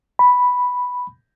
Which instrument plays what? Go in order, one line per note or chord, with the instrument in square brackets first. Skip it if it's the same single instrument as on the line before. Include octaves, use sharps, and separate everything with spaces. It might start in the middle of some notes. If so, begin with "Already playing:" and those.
[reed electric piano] B5